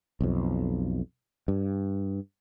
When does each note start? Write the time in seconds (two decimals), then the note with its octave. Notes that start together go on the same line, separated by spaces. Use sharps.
0.21 B1 F2
1.48 G2